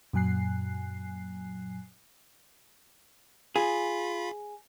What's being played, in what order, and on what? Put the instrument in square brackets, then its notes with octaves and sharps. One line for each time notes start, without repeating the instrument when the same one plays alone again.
[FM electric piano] F#2 A#2 F#3 G#5 F#6 C7
[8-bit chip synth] F4 B5 [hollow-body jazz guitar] G#4